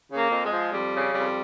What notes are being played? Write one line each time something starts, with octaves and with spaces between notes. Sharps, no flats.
C#3
A#3
F2
G#3
F3
F2 G3
C#3
F2 G3